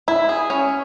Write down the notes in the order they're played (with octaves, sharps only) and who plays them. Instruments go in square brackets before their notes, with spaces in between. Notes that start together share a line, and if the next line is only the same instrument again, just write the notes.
[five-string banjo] E4 [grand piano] B5
[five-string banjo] G#4
C#4